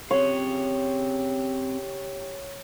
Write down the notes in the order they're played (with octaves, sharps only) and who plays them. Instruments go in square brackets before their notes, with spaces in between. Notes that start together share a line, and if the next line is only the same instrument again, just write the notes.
[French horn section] C#3 G4 [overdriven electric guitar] C4 F5 [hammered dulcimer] C#5